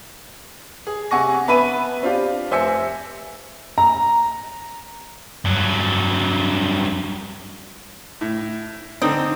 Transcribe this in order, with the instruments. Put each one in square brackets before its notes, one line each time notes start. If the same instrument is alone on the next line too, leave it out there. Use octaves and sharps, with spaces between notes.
[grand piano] G#4
C3 F#5 G#5 C#6 A#6
B3 B4 E5 B5 D#7
C4 D4 F4 G4
F1 C5 E5 G#5 E6 C#7
[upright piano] A#5
[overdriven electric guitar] G2 F#3
[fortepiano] A2
[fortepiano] D3 C4 [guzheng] D#4